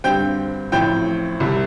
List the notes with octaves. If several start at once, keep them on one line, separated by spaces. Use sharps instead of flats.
G2 D3 G3 C4 G5 G6
A1 A2 F3 C4 G5 G6
C2 C3 G3